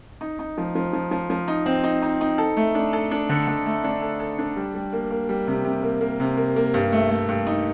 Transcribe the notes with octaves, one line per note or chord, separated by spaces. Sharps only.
D#4
D#4
F3
F3
F3
F3
F3
D#4
C4
D#4
D#4
D#4
A4
A3
D4
A4
D4
D3
D3
A3
D4
A4
A4
D4
G3
G3
A#3
A#3
G3
C3
C3
A#3
A#3
C3
A#3
A#3
G2
A3
A3
G2
D#4